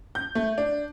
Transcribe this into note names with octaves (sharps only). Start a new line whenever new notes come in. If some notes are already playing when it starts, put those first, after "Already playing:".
G6
A3
D4